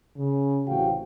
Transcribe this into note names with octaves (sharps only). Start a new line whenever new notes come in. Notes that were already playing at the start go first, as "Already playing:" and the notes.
C#3
A1 C3 F#4 F5 G5